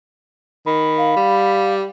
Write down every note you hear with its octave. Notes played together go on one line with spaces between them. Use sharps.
D#3 B5
F5
G3